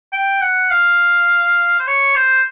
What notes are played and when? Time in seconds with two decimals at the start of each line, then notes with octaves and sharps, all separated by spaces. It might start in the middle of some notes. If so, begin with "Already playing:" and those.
0.13 G5
0.42 F#5
0.71 F5
1.79 C5
1.87 C#5
2.16 C5